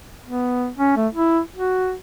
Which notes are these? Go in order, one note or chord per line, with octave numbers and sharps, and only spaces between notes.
B3
C#4
A3
E4
F#4